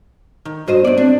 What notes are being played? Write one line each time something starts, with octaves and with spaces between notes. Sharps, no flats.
D#3
G2 F#4 C5 D#5
G2 B3 D5
C4 D4